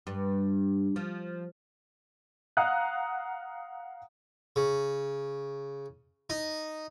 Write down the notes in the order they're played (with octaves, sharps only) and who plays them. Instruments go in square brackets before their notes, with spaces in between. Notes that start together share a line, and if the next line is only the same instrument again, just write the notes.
[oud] G2
F3
[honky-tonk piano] F5 F#5 A#5 D#6 F#6
[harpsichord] C#3
D#4